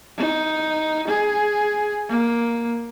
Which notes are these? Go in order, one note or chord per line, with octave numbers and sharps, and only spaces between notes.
D#4
G#4
A#3